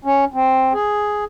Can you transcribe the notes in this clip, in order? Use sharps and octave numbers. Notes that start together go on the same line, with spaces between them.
C#4
C4
G#4